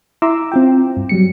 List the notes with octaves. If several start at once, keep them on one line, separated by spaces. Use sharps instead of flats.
E4 E5 A#5 C6 D6 E6
C4 F4 G5
G2
F#3 G3 C#7